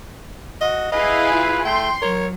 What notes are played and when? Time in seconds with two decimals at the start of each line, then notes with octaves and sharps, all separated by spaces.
0.61 F#4 D#5
0.92 E4 G#4 B4 D#5 F5
1.32 F4
1.65 A3 G5 C6
2.02 F#3 A#4 C#5